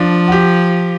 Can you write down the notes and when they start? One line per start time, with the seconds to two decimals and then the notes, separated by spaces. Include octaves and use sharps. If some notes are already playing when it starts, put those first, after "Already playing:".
Already playing: F3 D4
0.28 F#4
0.32 G4